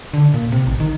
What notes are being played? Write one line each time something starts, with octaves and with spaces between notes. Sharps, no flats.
D3
A#2
C3
A1
D#3